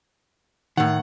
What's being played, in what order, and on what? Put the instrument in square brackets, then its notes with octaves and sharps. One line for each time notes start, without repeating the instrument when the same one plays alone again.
[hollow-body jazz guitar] A2 D#3 [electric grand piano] F#5